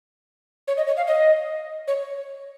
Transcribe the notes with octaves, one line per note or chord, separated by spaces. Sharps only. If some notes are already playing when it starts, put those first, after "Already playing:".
C#5
D#5
C#5
F5
D#5
C#5